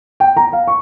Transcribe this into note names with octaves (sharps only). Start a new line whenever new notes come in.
G5
A#5
F5
C#6